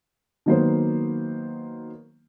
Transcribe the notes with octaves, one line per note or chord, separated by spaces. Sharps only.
D#3 F#3 A#3 B3 C5